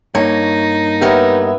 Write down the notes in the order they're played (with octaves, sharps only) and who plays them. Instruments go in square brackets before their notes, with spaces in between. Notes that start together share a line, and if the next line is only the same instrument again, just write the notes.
[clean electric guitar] G2 A#3 [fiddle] D#4 [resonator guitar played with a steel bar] C#5
[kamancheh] B3 E5 [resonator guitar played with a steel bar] G4 A#4 C#5